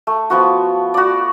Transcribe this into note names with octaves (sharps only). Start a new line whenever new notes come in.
A3
F3 B3 F#4
F#4 D5